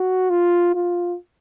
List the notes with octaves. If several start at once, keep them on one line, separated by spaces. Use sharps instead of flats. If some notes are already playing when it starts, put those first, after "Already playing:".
Already playing: F#4
F4
F4